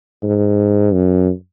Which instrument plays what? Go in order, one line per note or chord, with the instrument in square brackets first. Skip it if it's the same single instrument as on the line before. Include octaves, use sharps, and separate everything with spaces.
[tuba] G#2
F#2